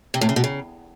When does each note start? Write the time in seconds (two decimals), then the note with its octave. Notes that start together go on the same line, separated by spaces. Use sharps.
0.14 C3
0.21 A2
0.29 C#3
0.36 B2
0.44 C#3